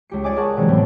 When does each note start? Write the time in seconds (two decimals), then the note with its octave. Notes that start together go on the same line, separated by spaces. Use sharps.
0.10 C#2 G4 C#7
0.24 D5 D#5 G#5 D6
0.36 G#4 A#4 F#5 A5 C#6 F6
0.57 C3 E3 F#3 G#3
0.68 D#2 A2 B3 C4